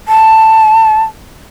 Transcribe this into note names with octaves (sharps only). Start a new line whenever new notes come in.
A5